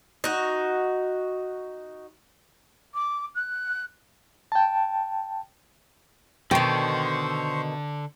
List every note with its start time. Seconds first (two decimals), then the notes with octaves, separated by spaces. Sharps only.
0.24 D#4 F#4
2.94 D6
3.35 F#6
4.52 G5 A5
6.51 B2 D3 D#3 C5 G5 C#6